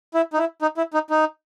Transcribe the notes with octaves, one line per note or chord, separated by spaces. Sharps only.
E4
D#4
E4
D#4
E4
D#4
D#4